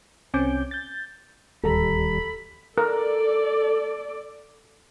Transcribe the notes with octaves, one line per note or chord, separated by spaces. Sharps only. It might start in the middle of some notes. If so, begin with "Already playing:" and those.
C2 C4 C#4 G#5 D6 G6
G6 A6
D1 D#2 G3 A4 A#5 B5
A4 A#4 D5